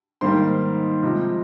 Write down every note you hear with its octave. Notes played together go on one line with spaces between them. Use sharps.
G#2 D#3 G3 A#3 C5 C6
C3 F3 G#3